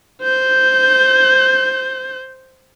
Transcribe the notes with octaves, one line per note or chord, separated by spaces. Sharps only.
C5 G6